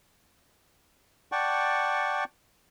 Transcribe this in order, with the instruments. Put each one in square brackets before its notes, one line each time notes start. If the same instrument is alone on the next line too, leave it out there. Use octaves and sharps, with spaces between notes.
[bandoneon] D5 F#5 G5 A5 C#6